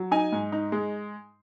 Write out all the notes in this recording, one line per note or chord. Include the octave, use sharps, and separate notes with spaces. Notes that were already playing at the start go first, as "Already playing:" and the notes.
Already playing: F#3
D#4 G#5
G#2
D#4
G#3